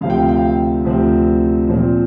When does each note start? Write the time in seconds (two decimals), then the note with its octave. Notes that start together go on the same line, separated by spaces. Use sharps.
0.01 D2 C3 F3 C4 F5
0.10 G5
0.20 F5
0.29 G5
0.38 F5
0.84 D2 C3 F3 C4
1.68 A#2 F3 C4